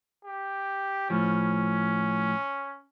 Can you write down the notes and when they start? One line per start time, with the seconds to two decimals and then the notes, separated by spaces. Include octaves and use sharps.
0.25 G4
1.10 A2 F3 C#4